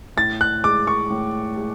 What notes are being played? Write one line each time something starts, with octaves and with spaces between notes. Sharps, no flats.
A2 A6
F#6
G#3 D6
C#6
A2
G#3